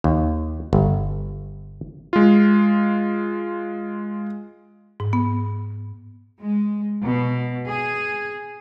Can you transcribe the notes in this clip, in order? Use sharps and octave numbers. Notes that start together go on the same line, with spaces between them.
D#2
G1
G#3 F4
G#2
B3
G#3
B2
G#4